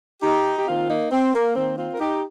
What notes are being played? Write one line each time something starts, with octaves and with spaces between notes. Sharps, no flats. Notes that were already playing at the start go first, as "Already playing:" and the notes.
D#4 G4
G4
D#3 A#3 C4 F4
A#3 D#4
C4
A#3
D#3 A#3 C4
C4 F4
A#4
D#4 G4